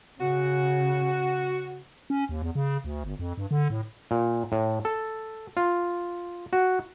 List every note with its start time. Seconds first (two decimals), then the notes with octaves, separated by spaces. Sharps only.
0.20 C#3 F#4
2.10 C#4
2.29 D#2
2.42 E2
2.55 C#3
2.85 D2
3.04 G1
3.19 F2
3.37 G2
3.51 D3
3.70 A2
4.11 A#2
4.52 A2
4.85 A4
5.57 F4
6.53 F#4